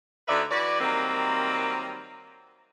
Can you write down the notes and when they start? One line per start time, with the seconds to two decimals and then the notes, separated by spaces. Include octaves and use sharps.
0.28 D2 D3 D#4 B4 D5 E5
0.51 E3 F#4 B4 D5
0.80 D#3 F#3 G3 A#3 C4